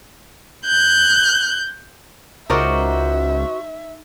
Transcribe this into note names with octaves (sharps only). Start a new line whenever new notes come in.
F#6 G6
C#2 D#4 F#4 A#4 C5 D5 E5